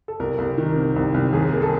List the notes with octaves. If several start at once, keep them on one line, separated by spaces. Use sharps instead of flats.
A4
C2 A#4
C2
D#3
C3
C2
C2
D#2 G#4
A#3
A4